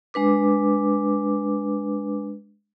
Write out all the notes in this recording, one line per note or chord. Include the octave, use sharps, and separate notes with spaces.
G#3 D4 B4 D6